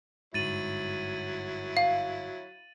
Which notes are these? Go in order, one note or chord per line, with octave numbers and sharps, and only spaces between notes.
G1 G#2 F#3 E4 A6 D#7 F#7
F5